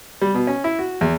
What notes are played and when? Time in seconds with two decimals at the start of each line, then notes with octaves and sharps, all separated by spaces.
0.22 G3
0.34 B2
0.47 C#4
0.64 E4
0.79 F#4
1.01 E2